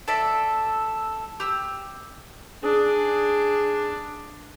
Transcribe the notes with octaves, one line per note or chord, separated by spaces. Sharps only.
A4 D5 E5
G4 E6
D4 G#4